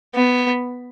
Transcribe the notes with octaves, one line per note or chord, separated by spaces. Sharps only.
B3